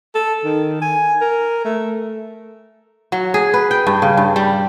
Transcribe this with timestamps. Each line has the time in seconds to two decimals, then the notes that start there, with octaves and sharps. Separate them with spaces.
0.15 A4
0.45 D#3
0.82 G#5
1.21 A#4
1.64 A3
3.12 F#3
3.34 G#4
3.54 B4
3.71 G5
3.87 G2
4.02 C#3
4.17 G2
4.36 G3